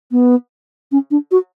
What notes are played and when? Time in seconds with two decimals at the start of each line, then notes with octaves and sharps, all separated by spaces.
0.11 B3
0.91 C#4
1.11 D4
1.31 F#4